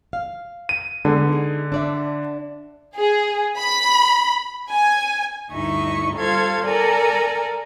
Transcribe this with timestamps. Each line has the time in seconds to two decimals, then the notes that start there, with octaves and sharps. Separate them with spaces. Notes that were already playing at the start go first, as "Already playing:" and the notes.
0.13 F5
0.69 D#7
1.05 D3 G#3 B3
1.28 D#4 G#4
1.72 D4 D5 E5
2.97 G#4
3.60 B5
4.71 G#5
5.50 D2 G2 D#4 E4 D#5 C#6
6.14 G3 F4 A4 C5 F5 G#6
6.65 A4 A#4 D5 G#5 A#5